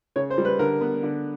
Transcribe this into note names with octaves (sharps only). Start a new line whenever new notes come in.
C#3 C#5
C5
G3
B4
D3 A#4
B3
D3